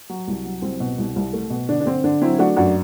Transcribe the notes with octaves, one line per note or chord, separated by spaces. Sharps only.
F#3
C2
F#3
C2 C4
B2
C2
C2
A3
B2
D3 D4
D4
D3 C4
D3 D4
F#3 C4 E4
E4
A3 D4 F#4
F#2 D4 F#4